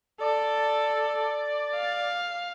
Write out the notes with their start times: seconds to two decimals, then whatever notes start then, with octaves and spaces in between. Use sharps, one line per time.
0.21 A4 D5
1.75 F5